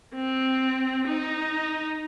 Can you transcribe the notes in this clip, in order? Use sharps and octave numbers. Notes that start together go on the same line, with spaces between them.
C4
D#4